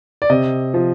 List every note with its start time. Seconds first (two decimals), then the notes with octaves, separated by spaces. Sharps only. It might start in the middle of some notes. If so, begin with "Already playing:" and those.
0.22 D5
0.30 C3 D#5
0.74 F3